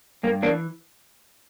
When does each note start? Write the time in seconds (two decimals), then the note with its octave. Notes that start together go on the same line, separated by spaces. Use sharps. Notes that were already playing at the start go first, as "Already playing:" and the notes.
0.23 G2 A#3
0.42 E3 A#3 D4